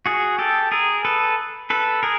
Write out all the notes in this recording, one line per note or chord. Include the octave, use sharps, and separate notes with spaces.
F#4 G#4
G4 A4
G#4 A#4
A4 B4
A4 B4
G#4 A#4